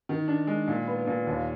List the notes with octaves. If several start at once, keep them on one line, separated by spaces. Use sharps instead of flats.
D#3
D4
G#3
A#2
B3
A#2
D#2